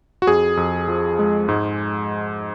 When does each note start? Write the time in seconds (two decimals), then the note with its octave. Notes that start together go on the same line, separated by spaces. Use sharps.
0.22 F#4
0.27 F2 G#4
0.57 F2
0.88 F3
1.19 G#3
1.49 G#2